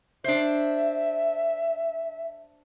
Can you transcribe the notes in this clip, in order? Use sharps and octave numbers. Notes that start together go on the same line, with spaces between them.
D4 C5 E5